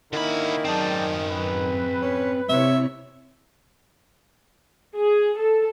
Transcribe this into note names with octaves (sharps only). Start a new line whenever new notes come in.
D3 D#3 A#3 C#4 E4 B5
F#2 C4 G#4 D5 G5 A5
B4
C#4
C3 E4 C#5 E5
G#4
A4